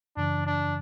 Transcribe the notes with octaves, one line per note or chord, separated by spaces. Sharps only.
F#2 C#3 E3 D4
D4